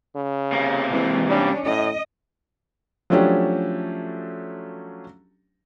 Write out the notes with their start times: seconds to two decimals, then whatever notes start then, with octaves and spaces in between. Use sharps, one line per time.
0.15 C#3
0.52 C3 A#3
0.89 E3 G#3 C4
1.28 G3 C#4 D4
1.65 A2 D#5
3.10 F3 F#3 A3 C#4 D4 G4